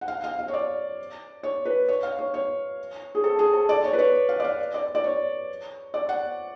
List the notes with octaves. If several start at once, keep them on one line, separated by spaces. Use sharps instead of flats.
F#5
F5
F5
F5
C#5
D5
C#5
B4
C#5
F5
C#5
C#5
G#4
A4
G#4
A4
D5
C#5
B4
C#5
F5
D5
F5
D5
D5
C#5
D5
F#5